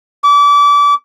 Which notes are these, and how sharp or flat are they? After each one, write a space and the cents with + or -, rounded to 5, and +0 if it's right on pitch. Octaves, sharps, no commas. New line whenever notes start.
D6 -30